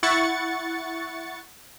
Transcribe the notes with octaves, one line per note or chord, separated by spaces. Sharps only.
E4 F#5 C#6 A6 C#7